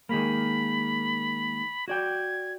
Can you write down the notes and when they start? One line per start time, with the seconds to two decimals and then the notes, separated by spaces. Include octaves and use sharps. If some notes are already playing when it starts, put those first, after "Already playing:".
0.09 D#3 G#3 A#3 B5
1.88 F#4 D5 G5 G#6